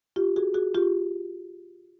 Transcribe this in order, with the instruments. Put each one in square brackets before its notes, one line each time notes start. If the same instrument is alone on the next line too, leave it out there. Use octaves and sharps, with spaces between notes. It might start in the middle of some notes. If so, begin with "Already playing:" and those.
[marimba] F4 G4
F#4 G#4
F#4 G#4
F4 G4